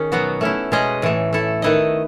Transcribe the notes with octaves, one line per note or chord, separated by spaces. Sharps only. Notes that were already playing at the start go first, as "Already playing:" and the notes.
Already playing: D#3 C#4 G#4
B2 F#3 B3 F#4
A3 C#4 E4
B2 G#3 C#4 G#4 D#5
A2 E3 A3
A3 E4 A4
D#3 A3 E4 B4 D#5